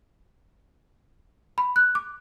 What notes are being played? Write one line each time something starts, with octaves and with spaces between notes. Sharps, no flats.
B5
F#6
D6